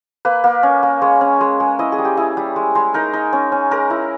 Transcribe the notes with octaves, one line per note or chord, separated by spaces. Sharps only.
A#3 B4
A#3
C#4
A#3
G#3 C#5
C#4
G#3
G#3
E4 D#5
G#4
G3
G4
E4 G#4
G3
G#3
G#3
D#4 A#4
D#4
C#4
C#4
G#3 A#4
E4